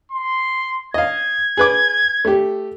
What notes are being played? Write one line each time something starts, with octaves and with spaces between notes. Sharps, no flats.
C6
D#5 F5 G#6
G#4 B4 D6
A3 G4